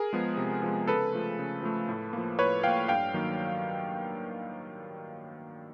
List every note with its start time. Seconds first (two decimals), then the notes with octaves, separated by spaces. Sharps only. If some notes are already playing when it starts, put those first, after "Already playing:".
Already playing: G#4 A#4
0.13 F3 G#3 B3
0.37 C3
0.63 F3 G#3 B3
0.88 C#3 A4 B4
1.13 F3 A3
1.39 C#3
1.63 F3 A3
1.89 A2
2.13 F3 A#3
2.39 A2 B4 C#5
2.63 F3 A#3 F5 G5
2.88 G2 F5 G5
3.14 D#3 F#3 A#3